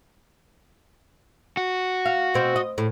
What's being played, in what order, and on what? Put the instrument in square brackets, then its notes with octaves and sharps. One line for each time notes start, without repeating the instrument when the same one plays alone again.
[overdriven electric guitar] F#4
[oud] F5
B2 C4
D#5
A2